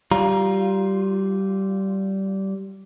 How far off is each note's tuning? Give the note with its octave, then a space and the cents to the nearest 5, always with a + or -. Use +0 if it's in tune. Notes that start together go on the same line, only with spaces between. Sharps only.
G3 -20 F4 +0 A#5 +20